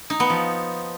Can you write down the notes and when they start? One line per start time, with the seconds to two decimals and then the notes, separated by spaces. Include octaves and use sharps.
0.10 D#4
0.20 B3
0.30 F3